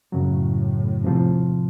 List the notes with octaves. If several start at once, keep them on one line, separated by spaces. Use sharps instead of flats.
F#2 A2 C#3 F#3
E2 C3 F3